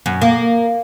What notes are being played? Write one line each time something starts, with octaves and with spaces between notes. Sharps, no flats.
F#2
A#3